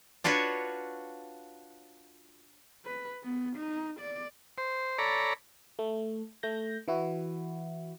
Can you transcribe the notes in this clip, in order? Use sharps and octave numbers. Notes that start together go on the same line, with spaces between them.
D4 F4 F#4 B4 C#5
B4
B3
D#4
D5
C5
A4 C#5 D5 A#5 B5
A3
A3 G6 A#6
E3 E4 F#4